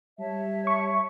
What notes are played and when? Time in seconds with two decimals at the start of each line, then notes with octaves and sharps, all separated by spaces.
0.19 G3 C#5 E5 A5
0.67 C#6